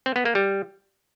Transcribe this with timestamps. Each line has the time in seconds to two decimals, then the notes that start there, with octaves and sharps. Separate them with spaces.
0.06 C4
0.16 B3
0.25 A#3
0.35 G3